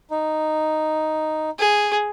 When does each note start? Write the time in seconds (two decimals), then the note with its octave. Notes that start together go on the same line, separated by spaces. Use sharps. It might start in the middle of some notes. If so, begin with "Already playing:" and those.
0.10 D#4
1.59 G#4